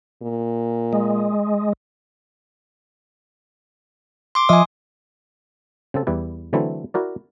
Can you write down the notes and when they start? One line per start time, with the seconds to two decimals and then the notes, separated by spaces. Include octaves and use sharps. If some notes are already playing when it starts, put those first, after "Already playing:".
0.23 A#2
0.93 G#3
4.35 C6 D6
4.49 F3 D#5 E5 G#5 D#6
5.94 C#3 C4 A4
6.07 E2 G3 E4 B4
6.53 D3 E3 F#3 A3 C4 E4
6.94 E4 F#4 A#4 D5